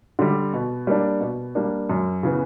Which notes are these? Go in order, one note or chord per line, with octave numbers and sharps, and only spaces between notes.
D3 G3
B2
G3 A#3 D4
B2
G3 A#3 D4
F#2
C#3 E3 B3